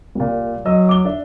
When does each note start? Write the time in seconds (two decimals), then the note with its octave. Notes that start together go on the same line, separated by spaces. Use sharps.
0.15 C2 A#2
0.66 F#3 D#5 E6
0.89 D6 G7
1.05 D4 E5